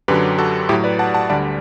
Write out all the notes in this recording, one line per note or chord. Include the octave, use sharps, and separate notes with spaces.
F#2 D3 F#3 G4 B4
F#4 A4
A2 F#3 E4 G4
B4 D5
F#5 A5
F#5 A5
D2 D3 G3 D5 F#5